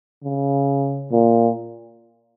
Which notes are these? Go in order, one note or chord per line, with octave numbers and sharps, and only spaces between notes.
C#3
A#2